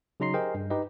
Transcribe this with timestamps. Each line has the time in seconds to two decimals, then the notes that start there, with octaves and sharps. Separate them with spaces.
0.20 C#3 F#3 D#4 A#5 C6 C7
0.34 G4 G#4 A#4 C5 D#5 G5
0.54 G2
0.70 D#4 G4 B4 D#5